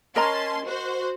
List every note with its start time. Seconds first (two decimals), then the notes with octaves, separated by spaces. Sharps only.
0.16 C#4 A#4 D#5 A5 A#5 C6
0.66 F#4 C5